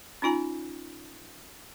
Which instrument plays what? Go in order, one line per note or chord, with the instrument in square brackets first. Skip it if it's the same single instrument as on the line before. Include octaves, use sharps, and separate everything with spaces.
[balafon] C#4 D#4 F4 G#5 A#5